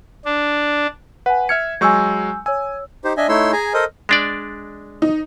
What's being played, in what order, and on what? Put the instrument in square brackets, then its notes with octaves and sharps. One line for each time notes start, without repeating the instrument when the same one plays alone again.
[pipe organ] D4
[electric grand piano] B4 [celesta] F#5 G#5
[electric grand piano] E5 F6 C#7 [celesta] G#6
[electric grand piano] F#3 G#3 C#6 [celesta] G#5 E6 G6
[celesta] C#5 E6 [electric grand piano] G#5
[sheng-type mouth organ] D#4 G4 C5
D4 D#5 E5 G#5
A3 D#4 E4 C#5 C6 E6
G#4 G#5 A#5
A4 A#4 C5 D#5 D#6
[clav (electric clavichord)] G#3 D4 D5
[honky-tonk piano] D#4